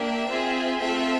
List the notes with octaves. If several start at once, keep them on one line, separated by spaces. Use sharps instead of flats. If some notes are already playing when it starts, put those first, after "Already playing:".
Already playing: A#3 D4 G4 E5
C4 F4 G#4
A3 C4 F4 A4 E5